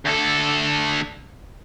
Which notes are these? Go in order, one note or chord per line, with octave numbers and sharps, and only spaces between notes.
D2 A4